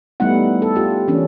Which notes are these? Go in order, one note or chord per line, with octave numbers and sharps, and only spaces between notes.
G3 A3 B3 D#4 E4 F#5
A4
F4 G4
E3 A#3 C#4 D4